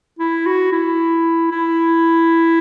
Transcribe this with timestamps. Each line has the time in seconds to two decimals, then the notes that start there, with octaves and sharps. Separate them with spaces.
0.19 E4
0.46 F#4
0.72 E4
1.51 E4